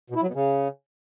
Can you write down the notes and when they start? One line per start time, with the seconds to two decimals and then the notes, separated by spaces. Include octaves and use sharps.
0.10 B2
0.16 E4
0.22 F#3
0.28 B2
0.34 C#3